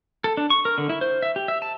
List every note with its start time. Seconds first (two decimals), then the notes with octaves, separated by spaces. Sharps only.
0.24 A4
0.37 D4
0.50 C#6
0.65 A#4
0.78 D3
0.89 E4
1.01 C5
1.22 E5
1.36 G4
1.48 E5
1.62 A5